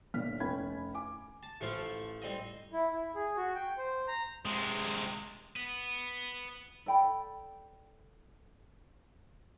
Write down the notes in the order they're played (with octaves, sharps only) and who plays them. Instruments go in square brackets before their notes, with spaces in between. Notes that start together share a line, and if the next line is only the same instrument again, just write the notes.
[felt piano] G1 G2 A#2 F6 B6
F1 C#4 G5 B5 G#6
G#5 D6
[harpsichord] A5
[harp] A1 F6 [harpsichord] F3 A3
[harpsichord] G3 C4 D#5
[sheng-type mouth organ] E4
E4
G#4
F#4
G5
C5
A#5
[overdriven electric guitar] C3 G#3
[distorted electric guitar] B3
[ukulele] A4 D5 G5 B5